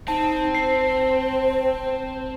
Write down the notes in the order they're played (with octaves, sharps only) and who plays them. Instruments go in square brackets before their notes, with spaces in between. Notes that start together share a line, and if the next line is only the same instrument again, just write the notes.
[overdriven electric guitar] C4 [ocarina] D#4 [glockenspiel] A5
[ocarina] C5 [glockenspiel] C7